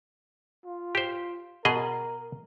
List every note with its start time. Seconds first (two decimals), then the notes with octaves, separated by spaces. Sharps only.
0.65 F4
0.95 G4 C5
1.65 B2 G#4 A#4 D#5